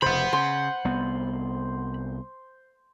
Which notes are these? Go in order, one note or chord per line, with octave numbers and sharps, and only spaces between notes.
F1 C#3 C5 F#5 B5
C#3 C6
C2 B3